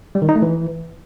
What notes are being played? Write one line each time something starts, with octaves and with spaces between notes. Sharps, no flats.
G3
D#3
D#4
A3
E3